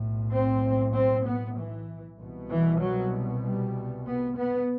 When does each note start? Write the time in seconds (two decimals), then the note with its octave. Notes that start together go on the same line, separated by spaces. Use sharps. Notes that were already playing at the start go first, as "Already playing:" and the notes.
Already playing: B1 A2
0.32 C4
0.94 C4
1.25 B3
1.57 E3
2.19 C2 B2
2.50 E3
2.81 F#3
3.43 G3
4.06 B3
4.37 B3